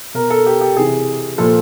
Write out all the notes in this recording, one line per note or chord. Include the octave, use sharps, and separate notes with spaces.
B2 A#4
A4
G4
G4
C3 E3 G#4
A#2 F3 A4